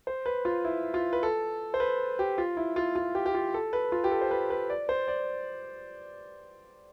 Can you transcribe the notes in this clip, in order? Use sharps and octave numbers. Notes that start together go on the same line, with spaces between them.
C5
B4
F4
E4
F4
B4
A4
C5
B4
G4
F4
E4
F4
F4
G4
G4
F4
A4
B4
F4
G4
A4
C5
B4
B4
D5
C5
D5